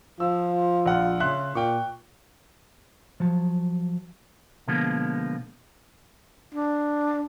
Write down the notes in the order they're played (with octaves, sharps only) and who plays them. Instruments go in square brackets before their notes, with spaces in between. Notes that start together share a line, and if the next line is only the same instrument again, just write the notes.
[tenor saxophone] F3 [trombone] F4 [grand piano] E6
[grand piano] A#1 F#5 F6
[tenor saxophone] C#3 [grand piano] E5 C6 F#6
[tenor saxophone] A#2 [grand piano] G5 C#6
[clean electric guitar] F3 F#3 A5
B2 D3 F3 G#3 A#3 B3
[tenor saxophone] D4